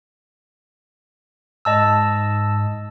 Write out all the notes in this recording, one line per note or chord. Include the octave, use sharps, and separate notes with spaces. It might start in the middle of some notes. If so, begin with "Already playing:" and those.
G#2 D#5 A5 E6